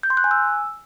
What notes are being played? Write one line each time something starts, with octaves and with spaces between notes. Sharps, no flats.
G6
C6
F#6
G#5
E6